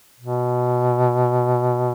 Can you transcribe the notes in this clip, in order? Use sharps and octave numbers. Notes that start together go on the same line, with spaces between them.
B2